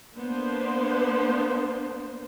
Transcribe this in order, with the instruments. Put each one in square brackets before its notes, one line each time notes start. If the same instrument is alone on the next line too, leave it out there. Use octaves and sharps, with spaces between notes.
[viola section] A#3 B3 D4 C5